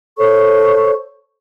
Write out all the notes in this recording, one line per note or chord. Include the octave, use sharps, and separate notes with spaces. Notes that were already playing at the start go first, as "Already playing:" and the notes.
A4 C5 C#5 C#6